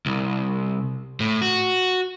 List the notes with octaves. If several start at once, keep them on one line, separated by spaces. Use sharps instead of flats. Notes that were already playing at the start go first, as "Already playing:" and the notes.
C2
A2
F#4